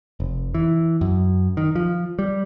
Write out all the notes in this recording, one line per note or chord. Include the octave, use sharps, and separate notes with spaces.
F1
E3
F#2
D#3
F3
G3